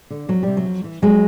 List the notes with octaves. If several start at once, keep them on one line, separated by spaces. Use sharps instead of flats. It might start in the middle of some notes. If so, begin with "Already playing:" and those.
D3
F2 F#3
C3 G3
F#3
F2
E3
F2 F#3 G#3